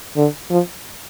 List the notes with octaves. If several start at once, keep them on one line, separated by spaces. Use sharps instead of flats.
D3
F3